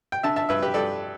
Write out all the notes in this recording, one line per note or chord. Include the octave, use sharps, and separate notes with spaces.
G5
D3 E5 A5
E5 A5
G2 B4 E5
G4 B4
G2 A4 D5